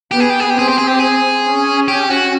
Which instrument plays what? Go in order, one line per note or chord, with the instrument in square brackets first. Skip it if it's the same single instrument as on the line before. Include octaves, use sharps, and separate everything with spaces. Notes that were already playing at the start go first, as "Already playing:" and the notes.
[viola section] B3 [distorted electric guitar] G4
[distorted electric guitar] G#4
G4
G#4
G4
[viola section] C4 [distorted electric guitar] G#4
[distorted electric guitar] G4
G#4
G4
G#4
[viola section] C#4
[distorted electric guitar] G4
F#4